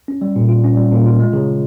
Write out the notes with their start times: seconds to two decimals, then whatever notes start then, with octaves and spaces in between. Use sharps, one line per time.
0.08 C#4
0.21 G3
0.36 A#2
0.49 F4
0.64 C#4
0.77 G3
0.92 A#2
1.06 F4
1.20 G#3
1.33 C#3